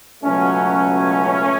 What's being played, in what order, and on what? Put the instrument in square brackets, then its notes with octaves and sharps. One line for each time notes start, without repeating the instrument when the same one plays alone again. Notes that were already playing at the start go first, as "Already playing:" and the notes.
[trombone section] C#2 B2 F#3 A3 C#4